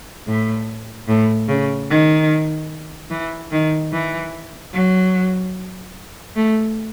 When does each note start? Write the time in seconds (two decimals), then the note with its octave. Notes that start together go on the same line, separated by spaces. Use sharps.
0.27 A2
1.08 A2
1.48 C#3
1.90 D#3
3.11 E3
3.51 D#3
3.92 E3
4.74 F#3
6.36 A3